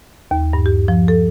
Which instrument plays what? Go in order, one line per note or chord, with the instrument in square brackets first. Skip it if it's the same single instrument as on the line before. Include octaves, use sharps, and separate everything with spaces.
[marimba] D#2
G2
G4
F3
A4